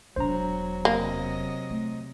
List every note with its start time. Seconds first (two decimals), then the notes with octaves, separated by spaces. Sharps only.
0.16 E1 F#3 D4 C5 A#5
0.85 C3 F#3 A#3 D#5
1.70 A3